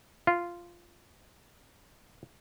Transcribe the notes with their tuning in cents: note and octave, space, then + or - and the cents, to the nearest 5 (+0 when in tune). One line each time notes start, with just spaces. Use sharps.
F4 -10